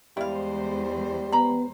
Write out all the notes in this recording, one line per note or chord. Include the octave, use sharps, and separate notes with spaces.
E2 G3 G#3 E4 C5 F5
B3 A#5 B5